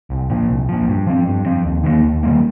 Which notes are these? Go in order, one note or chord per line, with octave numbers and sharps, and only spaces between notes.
C2
A#2 F3
C2
A#2 F3
G2
F3 C4
G2
F3 C4
D#2
D#3 G3 A#3
D#2
D#3 G3 A#3